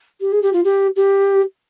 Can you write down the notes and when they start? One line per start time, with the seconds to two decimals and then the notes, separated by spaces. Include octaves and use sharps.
0.20 G4
0.32 G#4
0.42 G4
0.53 F4
0.64 G4
0.96 G4